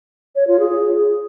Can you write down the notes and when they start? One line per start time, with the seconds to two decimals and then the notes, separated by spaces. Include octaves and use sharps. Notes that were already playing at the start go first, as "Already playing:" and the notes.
0.36 C#5
0.48 F4
0.59 G#4